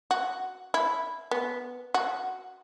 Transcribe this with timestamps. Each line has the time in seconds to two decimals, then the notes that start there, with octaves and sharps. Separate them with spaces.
0.11 F#4
0.74 E4
1.31 B3
1.94 F#4